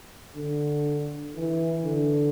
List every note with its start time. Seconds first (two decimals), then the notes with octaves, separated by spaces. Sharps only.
0.35 D3
1.35 E3
1.85 D3